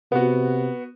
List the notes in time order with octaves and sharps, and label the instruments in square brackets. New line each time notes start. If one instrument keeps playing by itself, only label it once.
[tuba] C3 [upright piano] B3 F#4